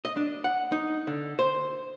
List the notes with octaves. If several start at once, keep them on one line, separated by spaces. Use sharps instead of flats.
D#5
D4
F#5
D#4
D3
C5